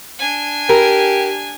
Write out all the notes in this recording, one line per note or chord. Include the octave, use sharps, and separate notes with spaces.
D4 G#5
G4 A#4